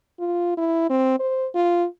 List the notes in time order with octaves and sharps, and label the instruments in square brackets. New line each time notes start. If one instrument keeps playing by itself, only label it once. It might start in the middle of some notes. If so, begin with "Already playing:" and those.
[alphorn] F4
E4
C4
C5
F4